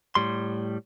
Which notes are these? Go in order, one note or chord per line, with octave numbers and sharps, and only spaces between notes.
A2 G3 C6